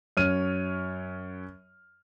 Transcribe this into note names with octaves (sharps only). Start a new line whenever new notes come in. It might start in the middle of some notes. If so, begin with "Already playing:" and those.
F#2 C#5 F6 D#7